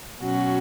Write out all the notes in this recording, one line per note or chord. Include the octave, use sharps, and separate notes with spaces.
B2 F#3 C#4 F#4